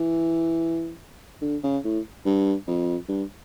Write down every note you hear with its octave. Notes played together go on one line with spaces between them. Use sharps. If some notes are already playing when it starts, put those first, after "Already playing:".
Already playing: E3
D3
C#3
A2
G2
F2
G2